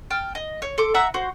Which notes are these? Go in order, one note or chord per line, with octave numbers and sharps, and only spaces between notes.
G5 A5 F6
D#5
C#5
A4 C6 D6
E5 F#5 A#5 E6
F#4 C5